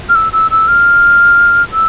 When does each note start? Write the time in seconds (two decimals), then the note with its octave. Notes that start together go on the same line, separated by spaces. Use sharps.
0.09 F6
0.15 E6
0.33 E6
0.51 E6
0.68 F6
1.73 E6